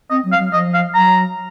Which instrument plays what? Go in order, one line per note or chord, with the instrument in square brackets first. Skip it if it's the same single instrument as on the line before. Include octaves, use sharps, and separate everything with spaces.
[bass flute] C4 [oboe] D#5
[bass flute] F#3
[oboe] F5
[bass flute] F#3
[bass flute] F3 [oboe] D#5
[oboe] F5
[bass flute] F#3 [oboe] A#5